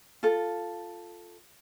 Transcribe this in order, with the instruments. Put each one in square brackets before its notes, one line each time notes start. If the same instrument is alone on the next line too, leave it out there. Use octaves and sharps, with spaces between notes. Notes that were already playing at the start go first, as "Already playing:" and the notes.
[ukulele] F4 A4